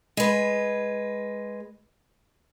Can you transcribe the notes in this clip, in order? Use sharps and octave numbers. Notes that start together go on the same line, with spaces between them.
G#3 B4